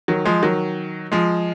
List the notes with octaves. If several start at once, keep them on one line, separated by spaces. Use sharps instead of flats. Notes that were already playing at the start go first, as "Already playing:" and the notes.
D#3 F#3
F3 G#3
D#3 F#3
F3 G#3